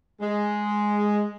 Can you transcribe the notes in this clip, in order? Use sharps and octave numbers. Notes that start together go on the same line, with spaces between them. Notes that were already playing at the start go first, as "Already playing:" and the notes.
G#3